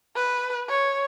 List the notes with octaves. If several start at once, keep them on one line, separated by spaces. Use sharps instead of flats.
B4
C#5